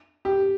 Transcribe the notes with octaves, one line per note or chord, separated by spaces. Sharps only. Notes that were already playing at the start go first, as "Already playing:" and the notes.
G4